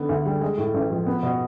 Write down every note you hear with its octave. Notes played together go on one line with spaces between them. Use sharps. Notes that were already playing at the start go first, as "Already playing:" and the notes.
Already playing: D3 B3
D2
G3
G#3
A2
A1
F3
B3
B2